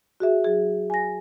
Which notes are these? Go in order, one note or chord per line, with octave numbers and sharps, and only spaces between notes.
F#4 G#4 E5
F#3 G#4
G#5 A#6